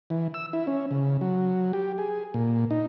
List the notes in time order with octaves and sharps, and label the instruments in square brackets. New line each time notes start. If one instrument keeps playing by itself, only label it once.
[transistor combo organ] E3
E6
E4
C#4
C#3
F#3
G4
G#4
A#2
D#4